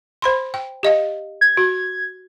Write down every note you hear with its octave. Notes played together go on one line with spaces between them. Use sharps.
C5 B5 C6
G5
G4 D#5 F5
G#6
F#4